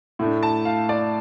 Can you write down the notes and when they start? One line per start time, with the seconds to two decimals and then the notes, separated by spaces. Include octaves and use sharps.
0.19 A2 A3 D4
0.43 A5
0.65 F5
0.89 D5